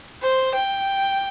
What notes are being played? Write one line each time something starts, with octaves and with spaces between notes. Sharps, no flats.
C5
G5